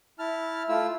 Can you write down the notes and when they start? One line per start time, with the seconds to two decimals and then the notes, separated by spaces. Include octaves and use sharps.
0.19 E4 A5 F6
0.69 A3 E4 F4 E6